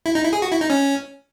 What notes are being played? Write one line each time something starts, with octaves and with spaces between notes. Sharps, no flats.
E4
D#4
E4
G#4
F#4
E4
D#4
C#4